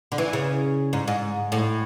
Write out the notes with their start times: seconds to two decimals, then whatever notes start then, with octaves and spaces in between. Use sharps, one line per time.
0.12 D3
0.18 E3
0.33 C#3
0.93 G#2
1.08 G#2
1.52 A2